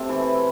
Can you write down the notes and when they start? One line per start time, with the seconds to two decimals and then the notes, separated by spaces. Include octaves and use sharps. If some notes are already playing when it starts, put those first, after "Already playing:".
Already playing: C3 A3 C4 A4
0.09 E3 E4